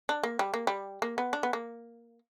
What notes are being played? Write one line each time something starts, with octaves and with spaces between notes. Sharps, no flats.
D4
A#3
G3
A#3
G3
A#3
B3
D4
B3
A#3